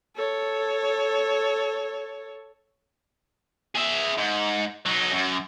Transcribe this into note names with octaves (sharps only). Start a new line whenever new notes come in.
A4 C#5
G#4 E5
G#2
F#3 D#4
F#2